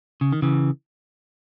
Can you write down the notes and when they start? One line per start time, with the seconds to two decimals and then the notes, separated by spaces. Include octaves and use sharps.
0.21 C#3
0.32 D#3
0.42 C#3 E3